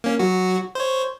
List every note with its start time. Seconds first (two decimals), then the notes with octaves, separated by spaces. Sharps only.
0.04 A#3 C#4
0.19 F#3 F#4
0.75 C5 C#5